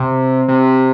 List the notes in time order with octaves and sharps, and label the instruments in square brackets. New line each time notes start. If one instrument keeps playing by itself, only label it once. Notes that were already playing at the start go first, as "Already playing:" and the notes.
Already playing: [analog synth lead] C3
C3